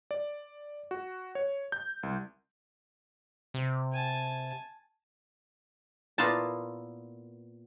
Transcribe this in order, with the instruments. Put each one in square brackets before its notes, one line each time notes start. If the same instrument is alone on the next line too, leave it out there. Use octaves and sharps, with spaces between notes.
[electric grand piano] D5
F#4
C#5
G6
C2
[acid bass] C3
[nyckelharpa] G#5 A5
[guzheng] A#2 B3 E4 F4 F5 A5